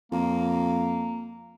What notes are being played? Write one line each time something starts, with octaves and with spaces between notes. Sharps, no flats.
F2 A#3